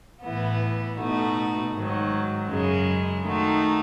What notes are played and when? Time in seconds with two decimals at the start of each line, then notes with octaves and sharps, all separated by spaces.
0.23 A2 E3 B3
0.98 B2 A3 D#4 F#4
1.73 G#2 D#3 F#3
2.48 F#2 C#3 G#3
3.24 D#3 A3 D#4 F#4